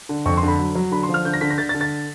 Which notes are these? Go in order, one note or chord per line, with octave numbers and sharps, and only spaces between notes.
D3
F2 C#6
C6
D3 B5
F#3
F#3
D3 B5
C6
F3
F6
D3 G6
A#6
D3 B6
A#6
D3 A6
A6
D3
A6